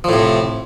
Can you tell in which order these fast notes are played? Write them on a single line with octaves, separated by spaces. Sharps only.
F3 A2 C3